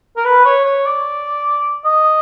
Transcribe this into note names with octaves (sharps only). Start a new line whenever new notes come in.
A#4
B4
C#5
C#5
D5
D#5